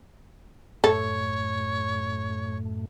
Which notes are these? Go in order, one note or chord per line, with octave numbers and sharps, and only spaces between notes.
F#2 A2 A3 A4 C#5